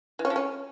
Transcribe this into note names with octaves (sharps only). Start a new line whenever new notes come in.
E3
C#4
F3
C#4